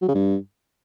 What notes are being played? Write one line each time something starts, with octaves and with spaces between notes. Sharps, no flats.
F#3
C#3
G2